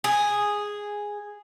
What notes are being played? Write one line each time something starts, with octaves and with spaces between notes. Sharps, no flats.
G#4